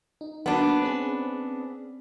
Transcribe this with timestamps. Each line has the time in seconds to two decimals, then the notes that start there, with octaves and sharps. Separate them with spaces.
0.21 D#4
0.46 F#3 A#3 B3 D4
0.82 C4 C#4 G#4